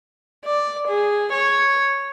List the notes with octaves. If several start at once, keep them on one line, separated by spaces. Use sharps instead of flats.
D5
G#4
C#5